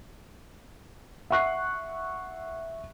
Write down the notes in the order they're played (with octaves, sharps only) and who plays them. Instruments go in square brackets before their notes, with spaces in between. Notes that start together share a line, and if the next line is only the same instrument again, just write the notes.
[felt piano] E5 F#5 C#6 F#6 C7